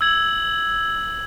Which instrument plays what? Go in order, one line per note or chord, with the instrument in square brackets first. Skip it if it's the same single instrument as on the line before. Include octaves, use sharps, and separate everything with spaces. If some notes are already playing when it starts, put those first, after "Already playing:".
[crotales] E6 G#6 F#7